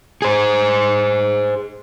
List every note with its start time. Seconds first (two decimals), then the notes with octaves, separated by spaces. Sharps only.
0.22 G#4 C5